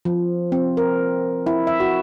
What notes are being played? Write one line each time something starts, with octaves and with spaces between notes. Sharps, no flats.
F3
C4
A#4
E4
E5
F#4